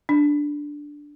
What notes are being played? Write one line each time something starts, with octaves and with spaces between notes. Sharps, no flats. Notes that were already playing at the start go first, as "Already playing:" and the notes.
D4